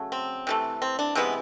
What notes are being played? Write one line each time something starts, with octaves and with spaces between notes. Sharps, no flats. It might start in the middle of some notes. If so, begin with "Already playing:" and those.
Already playing: C#3 F#3 A3
C4
C3 E3 A3
C4
D4
C3 E3 G#3 B3 C#4